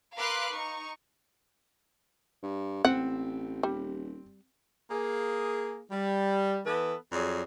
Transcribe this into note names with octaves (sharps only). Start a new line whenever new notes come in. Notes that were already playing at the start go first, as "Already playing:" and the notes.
A#4 B4 F5 C6 D6 F#6
D#4 C#6
G2
A1 C4 F#5
D#1 G3
A#3 G#4
G3
E3 B3 A4 B4
F2 F#3 G#4 D5